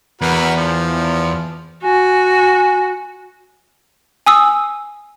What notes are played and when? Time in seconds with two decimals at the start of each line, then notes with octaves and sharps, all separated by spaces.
0.21 E2 F#4 A#4 B4
0.56 F3
1.84 F#4 G#5
4.26 G#5 D#6 E6